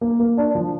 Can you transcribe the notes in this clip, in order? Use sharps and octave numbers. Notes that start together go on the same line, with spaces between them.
A#3
A#3
D4
F3